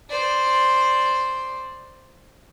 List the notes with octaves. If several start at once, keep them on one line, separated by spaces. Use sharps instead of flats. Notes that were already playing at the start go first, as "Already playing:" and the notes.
C5 D5